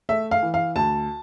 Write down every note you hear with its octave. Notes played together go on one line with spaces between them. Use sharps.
A3 E5
F5
E3
F5
D2 A5